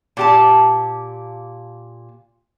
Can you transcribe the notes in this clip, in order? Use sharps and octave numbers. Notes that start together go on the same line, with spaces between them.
A#2 G4 A5